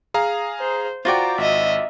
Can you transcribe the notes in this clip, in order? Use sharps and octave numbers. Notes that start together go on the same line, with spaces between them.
G#4 F5 A#5
C5
F4 F#4 C5 D5 G5 A#5
G#1 D#5 E5